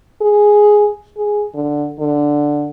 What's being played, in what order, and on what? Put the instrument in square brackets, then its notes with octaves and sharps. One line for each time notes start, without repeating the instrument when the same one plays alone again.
[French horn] G#4
G#4
D3
D3